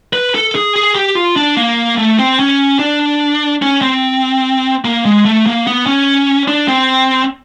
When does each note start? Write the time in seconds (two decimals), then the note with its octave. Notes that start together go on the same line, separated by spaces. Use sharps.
0.13 B4
0.35 A4
0.55 G#4
0.76 G#4
0.95 G4
1.15 F4
1.36 D4
1.57 A#3
1.97 A3
2.19 C4
2.39 C#4
2.79 D4
3.62 C#4
3.81 C4
4.85 A#3
5.05 G#3
5.25 A3
5.46 A#3
5.67 B3
5.86 C#4
6.48 D4
6.68 C4